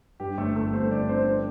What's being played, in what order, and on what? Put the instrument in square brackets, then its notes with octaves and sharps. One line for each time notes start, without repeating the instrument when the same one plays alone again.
[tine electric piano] G2 [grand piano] G4
[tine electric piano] G1 [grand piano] A3 A4
[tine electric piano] G1 [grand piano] A3 A4
[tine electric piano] G2 [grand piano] C4 C5
[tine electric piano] G1 [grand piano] D4 D5
[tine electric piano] D3 [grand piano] C4 C5
[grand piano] D4 D5